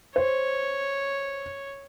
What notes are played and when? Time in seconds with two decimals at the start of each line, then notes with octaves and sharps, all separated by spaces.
0.16 C5 C#5